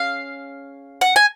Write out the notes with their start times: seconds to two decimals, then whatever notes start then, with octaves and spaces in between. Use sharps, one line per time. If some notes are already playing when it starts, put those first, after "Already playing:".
Already playing: C#4 G#4 F5
1.01 F#5
1.16 G#5